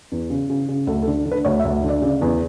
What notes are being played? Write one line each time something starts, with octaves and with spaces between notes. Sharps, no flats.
E2
C#3
C#3
C#3
D2 A4
A4
D3
D3
B4
D2 C#5
E5
D2
D3
D5
C#3
E2